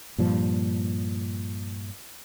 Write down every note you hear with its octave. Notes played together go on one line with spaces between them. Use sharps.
G2 A#2 F3